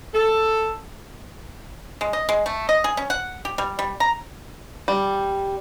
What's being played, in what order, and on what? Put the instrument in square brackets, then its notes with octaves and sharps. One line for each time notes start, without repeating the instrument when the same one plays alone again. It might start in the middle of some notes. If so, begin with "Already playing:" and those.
[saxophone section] A4
[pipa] G#3
D#5
G#3
A3
D#5
G#4
C#4
F#5
G4
G3
G3
A#5
[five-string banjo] G3